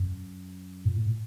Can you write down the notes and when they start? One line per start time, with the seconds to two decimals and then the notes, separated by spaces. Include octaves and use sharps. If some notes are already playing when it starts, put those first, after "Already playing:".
Already playing: F#2
0.85 A#2
0.96 A2